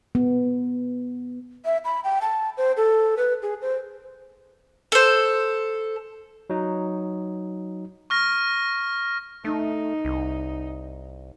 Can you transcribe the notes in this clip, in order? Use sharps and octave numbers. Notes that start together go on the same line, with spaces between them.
B3
E5
B5
G5
A5
C5
A4
B4
G#4
C5
A4 C5
F#3 D#4
C#6 F6 A#6
A3 D#4
C2